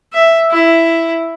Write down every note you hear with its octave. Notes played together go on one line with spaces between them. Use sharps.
E5
E4